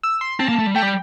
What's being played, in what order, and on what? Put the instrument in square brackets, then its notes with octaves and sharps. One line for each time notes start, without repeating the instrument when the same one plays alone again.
[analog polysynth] E6
C6
[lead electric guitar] C4 [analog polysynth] A5
[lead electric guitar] A#3
A3
G3
[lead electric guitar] A3 [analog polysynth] G5
[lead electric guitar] G3